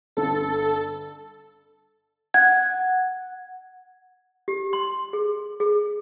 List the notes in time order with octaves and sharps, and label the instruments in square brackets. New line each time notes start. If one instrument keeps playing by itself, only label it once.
[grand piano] G1 D3 [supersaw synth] A4
[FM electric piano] F#5 [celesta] G#6
[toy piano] G4
C6
G#4
G#4